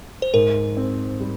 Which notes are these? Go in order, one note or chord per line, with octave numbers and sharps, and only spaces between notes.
C5
G#2 A#4
C4
G3